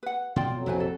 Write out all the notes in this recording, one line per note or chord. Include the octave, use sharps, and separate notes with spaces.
B4 F#5
B2 F4 D5 G5
F2 F#3
A#1 C3 C4 E4 B4 G#5
A4